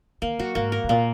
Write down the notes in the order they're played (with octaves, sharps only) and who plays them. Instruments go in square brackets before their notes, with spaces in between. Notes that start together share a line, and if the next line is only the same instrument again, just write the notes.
[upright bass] D#3 [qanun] A#3
[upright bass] F#3 [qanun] F#4
[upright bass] G#2 [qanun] A#3
[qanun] A#4
[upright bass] G#2
[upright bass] A#2 [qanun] A#3